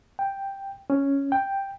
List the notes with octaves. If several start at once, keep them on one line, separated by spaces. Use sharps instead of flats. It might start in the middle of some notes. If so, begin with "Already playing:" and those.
G5
C#4
G5